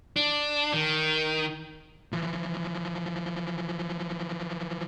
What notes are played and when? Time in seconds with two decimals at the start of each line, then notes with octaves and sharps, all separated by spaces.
0.16 D4
0.74 D#3
2.12 E3 F3